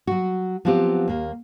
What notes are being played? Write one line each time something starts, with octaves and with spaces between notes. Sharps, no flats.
F#3 F#4
F3 F#3 B3 C4 F4 G4
D#2 A#3